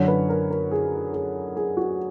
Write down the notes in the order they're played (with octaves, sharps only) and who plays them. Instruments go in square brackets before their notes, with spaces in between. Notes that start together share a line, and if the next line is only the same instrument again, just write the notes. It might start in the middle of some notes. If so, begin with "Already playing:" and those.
Already playing: [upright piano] F#2 D3 C#5
B4
A#4
A#4
G#4
G#4
G#4
F#4